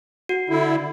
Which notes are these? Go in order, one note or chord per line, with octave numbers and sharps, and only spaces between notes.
F#4
D3 E4